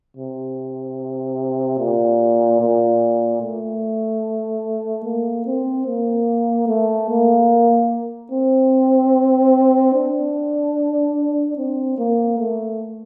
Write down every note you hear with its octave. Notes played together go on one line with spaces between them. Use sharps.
C3
A#2
A#2
A3
A#3
C4
A#3
A3
A#3
C4
D4
C4
A#3
A3